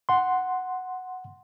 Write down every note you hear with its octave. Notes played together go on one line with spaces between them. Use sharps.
F#5 C6